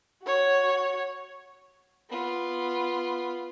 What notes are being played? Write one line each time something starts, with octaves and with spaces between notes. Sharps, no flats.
F#4 C#5
B3 F4